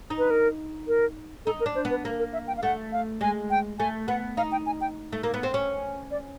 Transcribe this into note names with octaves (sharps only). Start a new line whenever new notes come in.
D#4
B4
A#4
A#4
D#4 A4
A#4
D4
C5
B3
B4
A#3 A#4
A#4
E5
G5
F5
A3 F#5
F5
G#3 G#5
G5
A3 G#5
B3 F#5
D#4 F5
G5
G#5
G5
A3
A#3
B3
C4
C#4
D5